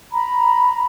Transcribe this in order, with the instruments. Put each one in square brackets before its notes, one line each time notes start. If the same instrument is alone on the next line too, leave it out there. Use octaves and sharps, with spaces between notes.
[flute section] A#5 B5